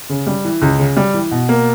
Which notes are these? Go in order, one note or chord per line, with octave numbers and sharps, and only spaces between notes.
C#3
G3
E3
C#2
C#3
G3
E3
B2
A#3